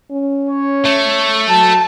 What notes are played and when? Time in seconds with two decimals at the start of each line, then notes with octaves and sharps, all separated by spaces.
0.11 C#4
0.50 C#5
0.85 A3
1.48 F#3 A5